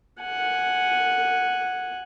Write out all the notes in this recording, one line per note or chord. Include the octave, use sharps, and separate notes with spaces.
F#5 G#5